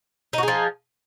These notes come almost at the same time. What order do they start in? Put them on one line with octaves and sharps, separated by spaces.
D#4 F#4 G#4 F3